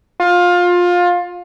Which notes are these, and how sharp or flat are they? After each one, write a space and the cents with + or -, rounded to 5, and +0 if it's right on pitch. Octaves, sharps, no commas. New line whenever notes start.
F4 +20